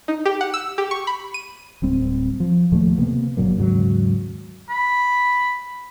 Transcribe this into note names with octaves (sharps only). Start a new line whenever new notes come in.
D#4
G4
F#5
E6
G4
C#6
B5
D#7
D1 G3 C4
F3
D#2 A#2 F3 A3
C3 A#3 B3
G1 A#2 F#3 A#3
D#2 G#2 C#3 F#3
B5